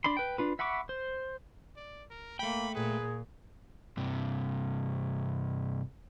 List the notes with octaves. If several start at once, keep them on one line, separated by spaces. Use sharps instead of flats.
D4 D5 B5 C6
B4 G5
D4 F4 B4
E5 F#5 B5 C#6 D6
C5
D5
A#4
A3 A#3 G5 B5
A#2 G#4 B4
G2 C3